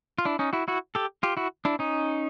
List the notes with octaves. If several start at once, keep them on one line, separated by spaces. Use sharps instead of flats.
F4
D4 E4
C#4 D#4
E4 F#4
E4 F#4
G4 A4
F4 G4
E4 F#4
D4 E4
C#4 D#4